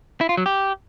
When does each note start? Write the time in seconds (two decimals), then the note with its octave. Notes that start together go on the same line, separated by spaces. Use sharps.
0.21 E4
0.29 F4
0.37 F#3
0.46 G4